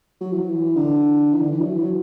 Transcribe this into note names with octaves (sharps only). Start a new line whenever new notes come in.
F#3
E3
F#3
E3
D3
E3
D3
E3
F#3
E3
F#3